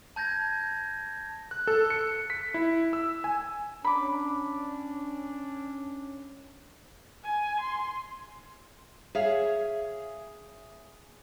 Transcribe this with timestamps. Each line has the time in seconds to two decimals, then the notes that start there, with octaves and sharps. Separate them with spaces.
0.16 A5 G6 G#6 A#6
1.51 F#6
1.67 A4
1.90 C#7
2.30 B6
2.54 E4
2.93 E6
3.24 G#5
3.84 C#4 D4 B5 D6
7.24 G#5
7.60 C6
9.15 G#4 C#5 E5 F5